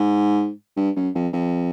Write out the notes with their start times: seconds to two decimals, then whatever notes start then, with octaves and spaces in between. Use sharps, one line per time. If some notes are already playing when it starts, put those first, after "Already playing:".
Already playing: G#2
0.77 G2
0.96 F#2
1.15 F2
1.33 F2